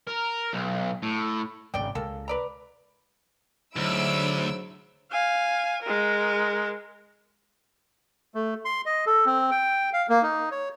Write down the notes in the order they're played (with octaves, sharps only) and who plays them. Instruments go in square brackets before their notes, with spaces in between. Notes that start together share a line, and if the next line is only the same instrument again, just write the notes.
[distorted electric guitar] A#4
B1
A2
[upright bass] G#1 C#3 [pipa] D5 G5
[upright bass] C#2 C#3 [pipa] A#3 A4
[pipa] B4 D5 A#5
[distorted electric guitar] D2 [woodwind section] G#2 F#3 [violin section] E4 E6 D7
[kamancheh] F5 G#5
G#3 A#4
[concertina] A3
C6
D#5
A4
C4
G5
F5
A#3
D#4
C#5